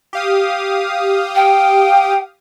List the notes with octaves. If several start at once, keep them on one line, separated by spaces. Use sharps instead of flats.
G4 F5 D#6
G5